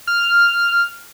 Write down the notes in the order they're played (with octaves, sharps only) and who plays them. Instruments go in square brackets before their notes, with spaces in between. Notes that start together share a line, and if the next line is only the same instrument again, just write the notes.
[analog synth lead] F6